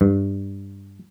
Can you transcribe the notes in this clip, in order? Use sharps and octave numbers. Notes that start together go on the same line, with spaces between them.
G2